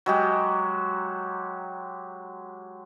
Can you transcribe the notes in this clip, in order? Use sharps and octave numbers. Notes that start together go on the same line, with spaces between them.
F#3 G#3 G4